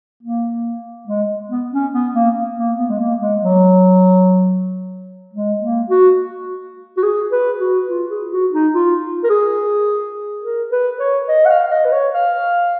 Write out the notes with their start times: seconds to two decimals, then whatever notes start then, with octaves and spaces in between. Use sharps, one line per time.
0.23 A#3
1.08 G#3
1.50 B3
1.72 C#4
1.93 B3
2.14 A#3
2.57 A#3
2.78 B3
2.90 G#3
2.99 A#3
3.20 G#3
3.42 F#3
5.33 G#3
5.62 A#3
5.90 F#4
6.97 F#4
7.03 G#4
7.32 B4
7.60 F#4
7.89 F4
8.09 G#4
8.31 F#4
8.53 D#4
8.74 F4
9.24 A#4
9.30 G#4
10.43 A#4
10.72 B4
11.00 C#5
11.28 D#5
11.45 F#5
11.50 F5
11.71 D#5
11.85 B4
11.93 C#5
12.14 F5